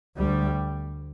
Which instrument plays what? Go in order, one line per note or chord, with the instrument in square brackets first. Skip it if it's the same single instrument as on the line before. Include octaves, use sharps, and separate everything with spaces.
[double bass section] D2 G3